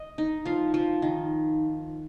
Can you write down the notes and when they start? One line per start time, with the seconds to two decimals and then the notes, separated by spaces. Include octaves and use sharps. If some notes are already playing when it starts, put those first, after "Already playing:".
Already playing: D#5
0.18 D#4
0.45 F3 F5
0.74 F3
1.02 D#3